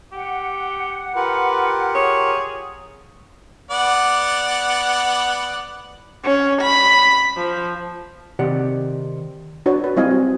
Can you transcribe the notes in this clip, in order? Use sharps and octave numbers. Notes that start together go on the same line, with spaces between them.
G4 F#5
F4 G4 A#4 B4
G#4 C#5
B3 D5 F#5
C#4
B5
F3
C3 D#3 G4 D5 F#5
D4 F#4 B4 C#5 D5
B4
G3 C4 E4 D#5 F5 G#5
F#4